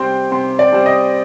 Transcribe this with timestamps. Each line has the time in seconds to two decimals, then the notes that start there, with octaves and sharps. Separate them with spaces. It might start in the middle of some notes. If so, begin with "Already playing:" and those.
Already playing: C3 G3 C4 G5 C6
0.31 C3 C6
0.59 D5
0.72 G3 C4
0.86 D#5